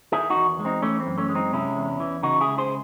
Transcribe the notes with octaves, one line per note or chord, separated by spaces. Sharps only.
D#3 E4 G#4
D#4 F#4
E2
G#3
C4 D#4
E3 A3 C#4
C4
F#2
A3 C#4
G#3
C4 D#4
C3 C#4 E4
E2
E3
C#3 D#4 F#4
E4 G#4
C#2
G#4 C5